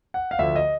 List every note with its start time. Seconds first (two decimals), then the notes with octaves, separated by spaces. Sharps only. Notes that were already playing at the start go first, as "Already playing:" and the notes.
0.14 F#5
0.31 F5
0.39 D2 D3 F3 E5
0.56 D#5